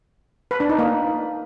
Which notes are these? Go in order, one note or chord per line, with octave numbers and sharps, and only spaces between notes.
B4
D4
D#4
A#3